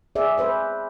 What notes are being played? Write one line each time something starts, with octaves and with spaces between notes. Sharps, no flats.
G#4 D5 E5
B4 C5 E5